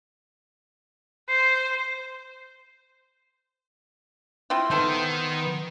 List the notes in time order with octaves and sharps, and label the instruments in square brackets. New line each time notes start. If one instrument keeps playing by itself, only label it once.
[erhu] C5 [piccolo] C7
[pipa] C4 E4 F4
[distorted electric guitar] D#3 [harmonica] B3 [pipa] A4 C5